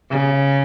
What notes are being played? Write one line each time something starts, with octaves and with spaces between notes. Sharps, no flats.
C#3